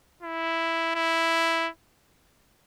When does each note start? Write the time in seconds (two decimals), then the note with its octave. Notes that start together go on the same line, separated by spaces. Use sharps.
0.23 E4
0.95 E4